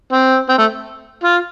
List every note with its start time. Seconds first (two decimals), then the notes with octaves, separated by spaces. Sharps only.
0.12 C4
0.49 C4
0.58 A3
1.24 F4